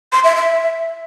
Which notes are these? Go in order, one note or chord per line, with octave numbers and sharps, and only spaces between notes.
C6
E5
E5